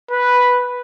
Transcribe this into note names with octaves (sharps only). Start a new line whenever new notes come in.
B4